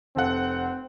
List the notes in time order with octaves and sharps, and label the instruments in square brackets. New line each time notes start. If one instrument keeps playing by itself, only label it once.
[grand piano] F1 A4 F#5 [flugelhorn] C4